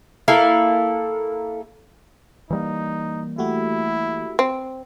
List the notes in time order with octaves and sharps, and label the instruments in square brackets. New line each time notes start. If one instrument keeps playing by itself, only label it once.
[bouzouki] A#3 E4 A4 F5
[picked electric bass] E3 G3 A#3 [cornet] D#4
[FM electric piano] A3 F#4 G4 [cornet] E4
[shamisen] C4